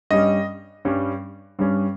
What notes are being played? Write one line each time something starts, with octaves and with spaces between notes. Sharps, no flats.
G2 G3 C#4 D#5
G2 G3 C#4
G2 G3 C#4